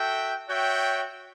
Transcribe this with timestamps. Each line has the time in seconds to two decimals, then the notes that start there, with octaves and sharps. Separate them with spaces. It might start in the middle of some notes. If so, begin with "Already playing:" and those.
Already playing: F#4 A4 E5 G5
0.48 F#4 C#5 E5 G5